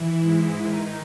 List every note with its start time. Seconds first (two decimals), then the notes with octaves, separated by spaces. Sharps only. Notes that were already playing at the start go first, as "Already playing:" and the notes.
Already playing: E3 E4
0.17 G#2 G#3
0.57 D#3 D#4